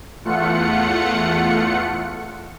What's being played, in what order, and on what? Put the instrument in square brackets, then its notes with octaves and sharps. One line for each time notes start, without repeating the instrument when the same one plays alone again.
[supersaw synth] E2 A3 F4 F#5 C#7